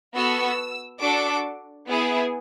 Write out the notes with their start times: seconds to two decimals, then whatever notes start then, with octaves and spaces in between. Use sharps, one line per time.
0.15 B3 F#4 A4 E6
1.01 D4 F#4 A4 D6
1.86 B3 E4 G#4